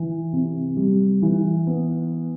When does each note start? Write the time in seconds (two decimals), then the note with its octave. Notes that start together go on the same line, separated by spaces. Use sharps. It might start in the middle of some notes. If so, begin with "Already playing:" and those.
Already playing: E3
0.33 C3
0.77 G3
1.22 E3
1.67 B3